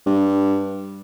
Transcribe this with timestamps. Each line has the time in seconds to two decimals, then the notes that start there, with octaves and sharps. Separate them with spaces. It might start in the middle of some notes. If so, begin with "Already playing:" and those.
0.06 G2